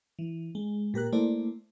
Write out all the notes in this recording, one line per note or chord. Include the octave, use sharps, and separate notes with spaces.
E3
G#3
A#2 G4 A#4 F#6
A3 A#3 E4 C5 D5